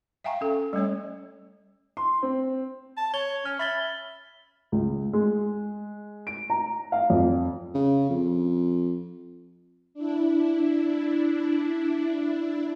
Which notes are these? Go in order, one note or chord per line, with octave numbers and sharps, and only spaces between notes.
E5 F5 G5 G#5 A#5 C#6
C#4 A4
G3 A3 C#4 C#5
C6
C4
A5
C#5 G#6 G7
C#4 F6
E5 B5 A6 G7
C#2
G#3
D7
A#5
F5
F2
C#3
F2
D4 E4